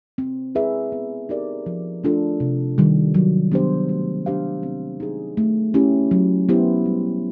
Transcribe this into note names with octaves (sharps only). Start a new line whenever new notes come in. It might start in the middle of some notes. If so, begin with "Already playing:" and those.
C4
E4 G#4 B4 E5
B3
D#4 G4 A#4 D5
F3
A3 D4 F4 A4
C3
D#3 G3
F#3
B3 D4 G4 C5
A3
D4 G4 C5 F5
C4
D#4 G#4
A3
C#4 E4 G4
F#3
B3 E4 G4 C5
G3